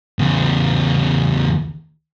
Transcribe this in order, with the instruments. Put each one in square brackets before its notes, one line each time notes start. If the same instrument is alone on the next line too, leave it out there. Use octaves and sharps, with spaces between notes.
[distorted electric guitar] E2 C#3